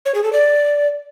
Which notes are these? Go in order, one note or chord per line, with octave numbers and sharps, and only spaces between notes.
C#5
G#4
A4
D5